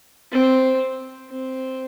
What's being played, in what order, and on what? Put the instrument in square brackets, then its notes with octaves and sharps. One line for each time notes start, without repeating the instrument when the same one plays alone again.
[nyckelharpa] C4
C4